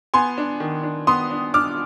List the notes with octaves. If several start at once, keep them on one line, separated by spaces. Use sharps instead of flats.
B3 G#5 C6
D4
D#3
D4
B3 C6 D#6
D4
D4 D6 F6